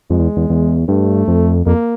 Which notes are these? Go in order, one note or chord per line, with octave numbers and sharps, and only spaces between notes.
F2 G#3
E2
E2
E2
G2 A3
F2
F2 A#3